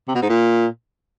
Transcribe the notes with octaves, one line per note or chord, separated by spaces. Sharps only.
C3
B2
G#2
A#2